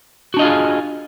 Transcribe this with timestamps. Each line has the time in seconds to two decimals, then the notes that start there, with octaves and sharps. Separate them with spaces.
0.34 F#4
0.37 D4
0.39 D#5
0.42 F4
0.45 G#4